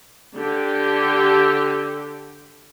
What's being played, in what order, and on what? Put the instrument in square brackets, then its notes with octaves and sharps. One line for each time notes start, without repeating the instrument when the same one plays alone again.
[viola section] D3 G4